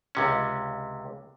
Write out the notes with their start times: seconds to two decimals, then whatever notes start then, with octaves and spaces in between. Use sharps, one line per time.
0.15 C#2 C3 C#4